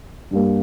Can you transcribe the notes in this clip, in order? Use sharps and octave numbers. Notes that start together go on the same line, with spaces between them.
G2 G3 A#3